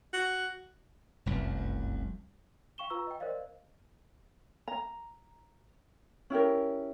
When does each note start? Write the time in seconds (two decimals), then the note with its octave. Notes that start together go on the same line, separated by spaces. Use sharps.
0.13 F#4
1.26 F1 C2 F#2
2.78 F5 G5 C#6 E7 G7
2.90 F4 B4 A#5 C#6 E6
3.07 D#5 G5
3.20 A#4 C5 D5 D#5 F5
4.68 A#5
6.30 C#4 E4 G4 A#4